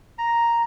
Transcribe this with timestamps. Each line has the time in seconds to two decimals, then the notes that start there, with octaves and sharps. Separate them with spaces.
0.18 A#5